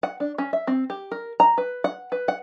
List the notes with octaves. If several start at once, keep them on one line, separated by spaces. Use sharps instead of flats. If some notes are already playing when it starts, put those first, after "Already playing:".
F#5
D4
C#4
E5
C4
G4
A#4
A#5
B4
F#5
B4
F#5